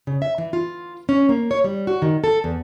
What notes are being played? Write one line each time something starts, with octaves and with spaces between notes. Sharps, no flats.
C#3
E5
E3
F4
C#4
A#3
C#5
G3
F#4
D#3
A4
E2